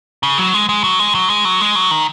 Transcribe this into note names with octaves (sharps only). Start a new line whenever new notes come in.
C#3
F#3
G#3
G#3
F#3
G#3
F#3
G#3
F#3
G#3
F#3
D#3